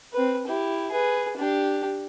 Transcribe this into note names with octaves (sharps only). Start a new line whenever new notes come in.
C4 B4
E4 G4
G#4 B4
D4 G4